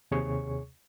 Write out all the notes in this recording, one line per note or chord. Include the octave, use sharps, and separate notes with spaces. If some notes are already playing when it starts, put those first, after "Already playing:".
D#2 C3 G#4 C#5 C#6